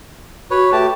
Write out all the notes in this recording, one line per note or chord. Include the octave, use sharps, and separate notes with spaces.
F#4 B4 C#5
A3 G4 A5